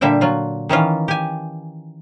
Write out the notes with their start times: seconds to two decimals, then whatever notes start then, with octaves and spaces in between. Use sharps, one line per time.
0.01 A#2 D3 G3 E5 G5
0.21 F#3 F4
0.69 D#3 E3 C#4 F4
1.08 G4 G#5